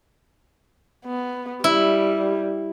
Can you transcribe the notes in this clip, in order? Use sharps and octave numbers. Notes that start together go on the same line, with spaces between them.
B3
G3 E4